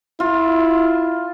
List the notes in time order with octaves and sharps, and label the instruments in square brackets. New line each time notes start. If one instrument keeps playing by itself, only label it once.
[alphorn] E4 [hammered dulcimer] F4